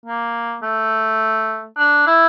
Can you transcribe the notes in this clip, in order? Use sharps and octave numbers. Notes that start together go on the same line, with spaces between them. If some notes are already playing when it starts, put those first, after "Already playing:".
A#3
A3
D4
E4